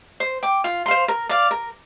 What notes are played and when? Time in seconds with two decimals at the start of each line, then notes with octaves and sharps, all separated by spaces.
0.20 C5
0.43 G5 D6
0.64 F4
0.86 C5 F5 C6
1.08 A#4
1.29 D5 F5
1.51 A#4